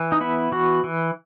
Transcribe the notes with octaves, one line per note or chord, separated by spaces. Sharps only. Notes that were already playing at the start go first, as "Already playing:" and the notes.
Already playing: E3
D#4
B3 E4
E3 F#4
E3